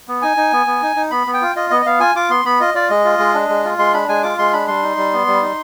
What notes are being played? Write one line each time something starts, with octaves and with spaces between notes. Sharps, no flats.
B3
D#4 G#5
D#4
B3
B3
D#4
D#4
B3 B5
B3
G5
F4
F4 D#5
B3 D#5
D#5
B3 F5
F4 G#5
F4 D6
B3 C6
B3 B5
F4 D#5
F4 D5
G#3 D#5
F4
G#3
D4
G#3
F4
G#3 C6
D4 B5
G#3 G#5
F4 D6
G#3 C6
D4 B5
G3 C6
D#4
G3
B3
G3
D#4